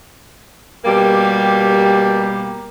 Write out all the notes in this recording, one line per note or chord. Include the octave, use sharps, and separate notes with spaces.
B2 G3 A#3 G4